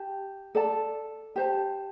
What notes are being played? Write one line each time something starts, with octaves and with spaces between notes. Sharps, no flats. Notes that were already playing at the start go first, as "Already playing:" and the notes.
Already playing: G4 A5
A4 D5 A5
G4 C5 A5